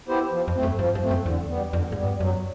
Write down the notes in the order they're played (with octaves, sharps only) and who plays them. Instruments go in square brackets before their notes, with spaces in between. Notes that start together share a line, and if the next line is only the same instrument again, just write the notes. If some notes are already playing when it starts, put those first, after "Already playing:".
[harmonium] B3 E4 G4 C5
F3
[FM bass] F2
[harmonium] A3 C4
[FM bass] F#2
[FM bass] G2 [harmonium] F3
[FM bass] G2
[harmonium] A3 C4
[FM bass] F#2
[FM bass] E2 [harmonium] D3
[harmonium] G3 B3
[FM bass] F2 [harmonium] D3
[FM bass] G#2
[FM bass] G2 [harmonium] G3 B3
[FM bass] F#2 [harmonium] F#3